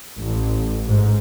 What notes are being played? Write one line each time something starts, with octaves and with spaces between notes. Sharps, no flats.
A1
G#2